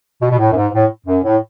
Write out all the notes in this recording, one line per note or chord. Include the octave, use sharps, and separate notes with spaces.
B2
B2
A2
F#2
G#2
A2
F#2
A2